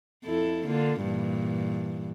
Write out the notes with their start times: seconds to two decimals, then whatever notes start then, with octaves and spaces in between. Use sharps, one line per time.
0.25 F2 E4 A4
0.66 D3 A#3 F4
1.03 G2 A#2 E3